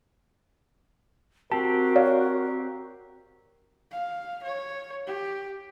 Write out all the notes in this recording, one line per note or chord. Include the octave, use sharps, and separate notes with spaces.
C4 F#4 G4 A#4 A5
C#5 D5 F5
F5
C#5
G4